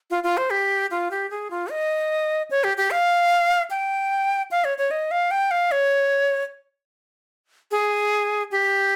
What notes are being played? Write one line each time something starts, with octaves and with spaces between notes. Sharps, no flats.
F4
F4
C5
G4
F4
G4
G#4
F4
D#5
C#5
G4
G4
F5
G5
F5
C#5
C#5
D#5
F5
G5
F5
C#5
G#4
G4